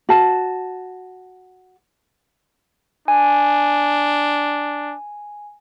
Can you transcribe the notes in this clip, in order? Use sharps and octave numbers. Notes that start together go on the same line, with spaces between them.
F#4 A5
D4 G#5